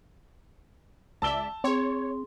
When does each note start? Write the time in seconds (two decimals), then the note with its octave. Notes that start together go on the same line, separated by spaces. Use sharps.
1.22 C#2 D5 E5 A5 E6 G7
1.64 C4 G#4 C#5 C6